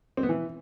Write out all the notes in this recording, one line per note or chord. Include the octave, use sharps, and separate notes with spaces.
C4
B3
E3